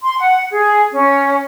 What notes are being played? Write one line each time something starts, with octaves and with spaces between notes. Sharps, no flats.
C6
F#5
G#4
C#4